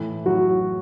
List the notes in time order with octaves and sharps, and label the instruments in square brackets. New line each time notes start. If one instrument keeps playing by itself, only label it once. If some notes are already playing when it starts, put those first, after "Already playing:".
Already playing: [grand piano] A2 E3 E4
E3 F#3 F#4